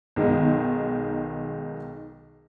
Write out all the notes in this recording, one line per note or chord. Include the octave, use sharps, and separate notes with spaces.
B1 D#3 G#3